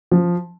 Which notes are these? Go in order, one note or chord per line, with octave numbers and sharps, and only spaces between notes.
F3